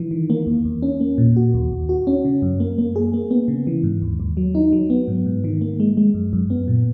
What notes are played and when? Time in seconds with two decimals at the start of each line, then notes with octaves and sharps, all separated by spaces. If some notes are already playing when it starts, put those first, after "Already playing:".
Already playing: E3
0.11 D#3
0.30 A#3
0.47 E2
0.65 E2
0.82 C#4
1.00 A#3
1.18 A#2
1.36 F#4
1.54 D#2
1.72 D#2
1.89 F#4
2.07 C#4
2.25 C#3
2.42 F#2
2.60 A#3
2.78 A#3
2.96 G#4
3.14 A#3
3.31 B3
3.48 C#3
3.67 E3
3.84 G#2
4.02 D#2
4.20 D#2
4.37 F#3
4.55 D#4
4.73 F#3
4.90 B3
5.08 G#2
5.26 G#2
5.44 D#3
5.61 A#3
5.80 G#3
5.97 G#3
6.14 F#2
6.33 F#2
6.50 B3
6.68 A#2